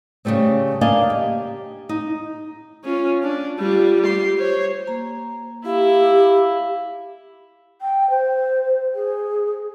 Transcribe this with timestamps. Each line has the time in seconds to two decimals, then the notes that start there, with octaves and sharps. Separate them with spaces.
0.25 C#3 F#3 G3 A3 C4
0.81 A#3 D4 D5 D#5 F5 G#5
1.10 G4
1.89 D#4
2.85 C#4 F4
3.23 D4
3.59 G3 F4
4.02 G4 C6
4.37 C5 C#5
4.87 A#3 A#5
5.65 E4 G4 F5
7.81 G5
8.10 C5
8.95 G#4